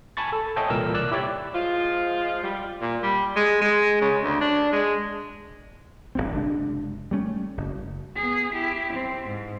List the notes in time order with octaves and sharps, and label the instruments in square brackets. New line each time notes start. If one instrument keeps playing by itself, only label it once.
[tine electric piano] G#5 A5 B5 C#6 A6
A4
A4 C#5 D#5 E5 G5 G#5
C2 A#2 E3 A#4 E6
D5 E6 F#6
E4 G4 C#5 D5
[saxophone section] F3 G#3 F4
G3
[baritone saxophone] A#2
G3
G#3
G#3
C#3
D2
D4
G#3
[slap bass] D1 G1 G2 C4
F#1 C3 G#3 D4
G3 A3 C#4
F#1
[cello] B3 G#4
E4 G4
C4
G#2